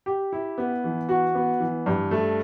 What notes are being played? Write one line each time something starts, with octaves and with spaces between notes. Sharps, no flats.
G4
E4
B3
E3
F#4
B3
E3
G2
A3